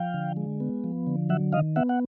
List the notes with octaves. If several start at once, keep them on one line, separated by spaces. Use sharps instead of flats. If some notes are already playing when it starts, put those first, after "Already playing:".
Already playing: F3 F5 G5
D3
G#3
B3
F3
D3
F#3 E5 F#5
D#3 D#5 F5
B3 E5 F#5
F#5